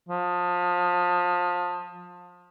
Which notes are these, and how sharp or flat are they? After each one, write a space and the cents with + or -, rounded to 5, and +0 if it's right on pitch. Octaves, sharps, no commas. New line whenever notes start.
F3 +25